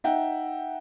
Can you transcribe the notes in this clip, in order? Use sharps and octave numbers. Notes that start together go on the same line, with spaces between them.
D#4 E5 F#5 G5